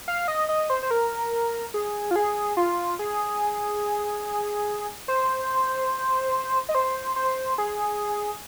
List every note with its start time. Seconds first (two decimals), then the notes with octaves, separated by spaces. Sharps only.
0.08 F5
0.28 D#5
0.49 D#5
0.70 C5
0.83 C5
0.91 A#4
1.74 G#4
2.11 F4
2.16 G#4
2.57 F4
2.99 G#4
5.08 C5
6.69 D#5
6.75 C5
7.16 C5
7.58 G#4